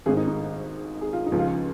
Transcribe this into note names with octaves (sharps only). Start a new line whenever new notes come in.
G#1 G#2 D#3 G#4
D#4
D#4
G#4
F4
D#4
C#2 C#3 F3
F4